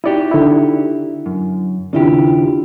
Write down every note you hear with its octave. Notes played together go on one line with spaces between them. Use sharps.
D#4 E4 F#4 G4 D5
D3 E4
F#2
D#2 C#3 D4 E4 F4 G4